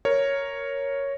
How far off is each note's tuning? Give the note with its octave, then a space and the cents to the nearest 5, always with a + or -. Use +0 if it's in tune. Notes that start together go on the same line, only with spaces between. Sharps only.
A#4 +0 C#5 +0